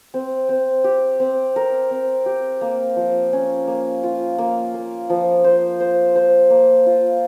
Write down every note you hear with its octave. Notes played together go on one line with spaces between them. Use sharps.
C4
C4
G4
C4
A#4
C4
G4
A#3
F3
C#4
A#3
F4
A#3
A#3
F3
C5
C5
C5
A#3
F4